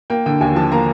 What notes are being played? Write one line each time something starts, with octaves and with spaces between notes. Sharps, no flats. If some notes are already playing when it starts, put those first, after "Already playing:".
A#3 G5
D3 G5
D#2 G#5
F3 A5
A#3 A#5